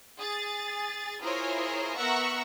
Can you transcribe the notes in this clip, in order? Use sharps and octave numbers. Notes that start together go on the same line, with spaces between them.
G#4 A6
E4 F4 G#4 A#4 C5 C#5
B3 A#4 E5 F#5 C#6